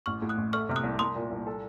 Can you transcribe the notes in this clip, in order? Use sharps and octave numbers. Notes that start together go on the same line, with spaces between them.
A1 C#6 F6
A2
D#6 F#6
A1
A3 C#6 F6
C3 F6
D#6 F#6
C2
C2 C6 D#6
A#2
C2
A4